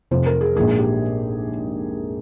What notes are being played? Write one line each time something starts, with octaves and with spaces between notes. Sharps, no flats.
F1 F2 C3 F3 C5
A#4
G#4
A#1 G#2 F3 A#3 G#4
G4